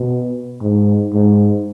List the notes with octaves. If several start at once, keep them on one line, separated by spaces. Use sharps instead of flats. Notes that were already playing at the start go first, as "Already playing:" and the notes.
Already playing: B2
G#2
G#2